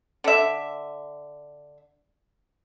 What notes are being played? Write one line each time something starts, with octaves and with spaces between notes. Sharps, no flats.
D3 E5